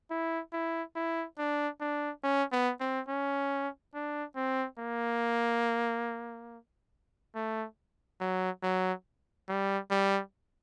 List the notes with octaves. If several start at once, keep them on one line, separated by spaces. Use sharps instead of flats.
E4
E4
E4
D4
D4
C#4
B3
C4
C#4
D4
C4
A#3
A3
F#3
F#3
G3
G3